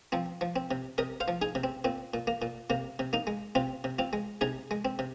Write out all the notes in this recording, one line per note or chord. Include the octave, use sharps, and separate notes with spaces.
F3 C4
F3
C4
C3
C3 A#4 D#5
C5 F5
F3
D#4 G#4
C3
C4
A#2 C4
A#2
A#3
A#2
C3 A#3
C3
A#3 D#4
G#3
C3 C4 F4
C3
C4 F4
G#3
C3 D#4 G#4
G#3
C4
C3